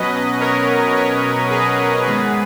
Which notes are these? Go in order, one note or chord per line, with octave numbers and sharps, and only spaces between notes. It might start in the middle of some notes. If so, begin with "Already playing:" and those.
Already playing: B2 F#3 C#4 B4 D#5
A#4 C#5
A#4 C#5
G#4 B4
G#2 D#3 G#3 B3 G#4 B4